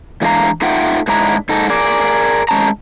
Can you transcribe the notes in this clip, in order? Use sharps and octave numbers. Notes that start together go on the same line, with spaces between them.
E3 G#3 D4 D5 F5 A#5
A3 D#4 F4 E5 F#5 G5
G#2 G#3 D4 E4 A#5
G#2 D#4 A4
G#4 A#4 D5
G#3 C#4 A5 A#5